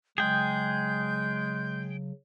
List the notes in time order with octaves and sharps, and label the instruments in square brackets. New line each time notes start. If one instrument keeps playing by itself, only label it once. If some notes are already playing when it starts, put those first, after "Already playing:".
[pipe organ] C#3 F#3 [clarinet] G#3 [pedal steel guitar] G#4 G5 [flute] G6